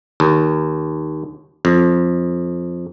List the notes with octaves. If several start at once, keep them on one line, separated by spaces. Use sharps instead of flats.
D#2
F2